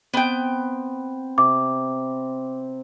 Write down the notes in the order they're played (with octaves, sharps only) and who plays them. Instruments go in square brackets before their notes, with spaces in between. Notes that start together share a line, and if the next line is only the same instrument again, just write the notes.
[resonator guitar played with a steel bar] B3 G5 [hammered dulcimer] C4
[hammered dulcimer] C3 [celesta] D6